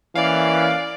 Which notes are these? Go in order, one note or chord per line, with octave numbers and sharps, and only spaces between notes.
E3 A#3 C#4 D5 F5